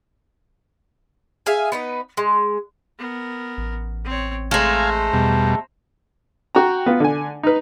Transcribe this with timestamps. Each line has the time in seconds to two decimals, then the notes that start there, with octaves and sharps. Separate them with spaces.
1.46 G#4 E5 F5 G#5
1.72 B3 D#4 B4
2.17 G#3
2.99 B3 A#4
3.57 A1
4.05 C4 C#5
4.51 G#3 A3 C5 F5 G#5 A#5
5.13 E2 B2 G3
6.55 F#4 G5 A#5
6.86 B3 F4
7.00 D3 G#5
7.43 D#4 B4